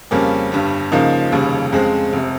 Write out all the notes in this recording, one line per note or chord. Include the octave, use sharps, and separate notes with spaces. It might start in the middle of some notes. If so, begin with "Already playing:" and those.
F2 C#3 G3 A#3 C#4
G1 G2 G3
C#2 C#3 F3 A#3 D#4
F1 D#2 C#3 G3
F2 C#3 G#3 C4
F1 C3